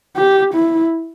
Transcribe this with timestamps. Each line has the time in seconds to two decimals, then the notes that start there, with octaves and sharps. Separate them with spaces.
0.17 G4
0.54 E4